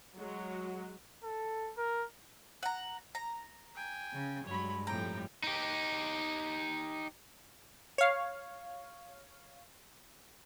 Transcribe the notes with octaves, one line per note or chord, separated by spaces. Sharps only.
F#3 G#3 F#4
A4
A#4
F#5 A#5
A#5
G5 G#5
C#3
G2 F#3 G#3 C#5 B5
F2 A2 G3 G5 A#5
D#4 G4
C#5 F5